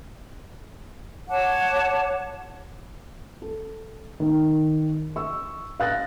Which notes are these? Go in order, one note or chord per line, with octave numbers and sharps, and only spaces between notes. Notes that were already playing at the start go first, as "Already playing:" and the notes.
C#5 F#5 A5 D6
A4
D#3
C#6 E6
F5 F#6 A6 A#6